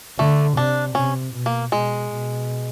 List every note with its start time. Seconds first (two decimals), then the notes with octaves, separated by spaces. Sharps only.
0.19 D3 A3
0.57 C3 D4
0.95 C3 C#4
1.34 B2
1.46 A#3
1.72 B2 G#3
2.10 B2